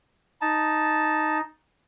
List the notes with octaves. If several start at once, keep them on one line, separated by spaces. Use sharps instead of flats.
D#4 A5